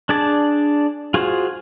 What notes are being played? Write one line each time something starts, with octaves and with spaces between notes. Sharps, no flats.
D4 G#4 D5 A5
F4 F#4 G#4 C5